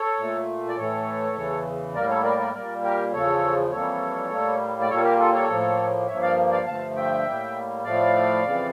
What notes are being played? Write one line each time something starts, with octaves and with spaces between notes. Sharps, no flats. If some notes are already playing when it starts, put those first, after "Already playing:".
Already playing: A4 C#5
A#2 A3
D5
A2 E3 A3 A4 C#5
E2 C#3 E3
A2 G3 A#3 A#4 D5
A4 C#5
A#4 D5
A#4 D5
A#2 G3 A#3 A#4 D5
G4 A#4
E2 C#3 F3 A4 C#5
F2 E3 G3 A#3 A4 C#5
A2 G3 A#3
D5
A#2 G3 A#3 A4 C#5
G4 A#4
F4 A4
A4 C#5
A2 F3 A#3
G2 F3 A#3 C#5 E5
D5 F5
D5 F5
G2 D3 F3 A3 F5 A5
E5 G5
A2 G3 A#3
A2 F3 A3 D5 F5
F2 C#3 E3